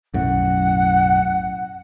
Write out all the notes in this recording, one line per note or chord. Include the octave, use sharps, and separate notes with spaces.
B1 F#2 A2 F#5